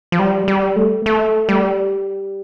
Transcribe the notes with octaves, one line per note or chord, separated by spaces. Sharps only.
F3
G3
G3
A3
A3
G3